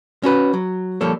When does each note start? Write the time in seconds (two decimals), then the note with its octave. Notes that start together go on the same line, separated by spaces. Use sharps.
0.23 C#4 F#4 B4
0.54 F#3
1.01 F3 G3 A#3 A4 C#5